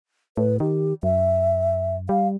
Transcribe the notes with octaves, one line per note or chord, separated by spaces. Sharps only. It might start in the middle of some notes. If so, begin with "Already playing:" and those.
A2 B4
D#3 G4
F#2 E5
G3 F5